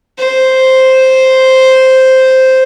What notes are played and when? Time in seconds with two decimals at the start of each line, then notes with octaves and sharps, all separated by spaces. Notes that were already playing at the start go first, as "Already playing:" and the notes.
0.19 C5